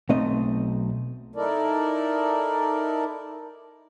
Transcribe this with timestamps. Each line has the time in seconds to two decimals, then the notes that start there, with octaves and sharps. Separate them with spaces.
0.09 B1 A3 C4 D#5
1.35 D#4 E4 A4 A#4 D5